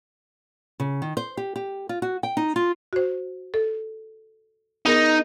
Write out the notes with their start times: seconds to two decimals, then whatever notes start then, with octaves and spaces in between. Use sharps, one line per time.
0.80 C#3
1.02 D#3
1.17 C5
1.37 G4
1.56 G4
1.89 F4
2.02 F#4
2.23 G5
2.37 D#4
2.56 F4
2.93 F#4 C5
3.54 A4
4.86 B3 D#4 G#4 A#4